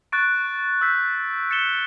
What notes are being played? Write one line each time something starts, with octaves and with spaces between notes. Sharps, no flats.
C#6 F#6 A6 D7
E6 G6 B6
A6 C#7 E7 G7